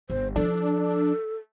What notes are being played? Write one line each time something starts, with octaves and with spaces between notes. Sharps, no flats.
G1 C5
F3 D4 E4 A4